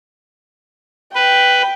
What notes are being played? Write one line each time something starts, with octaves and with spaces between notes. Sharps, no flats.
B4 G5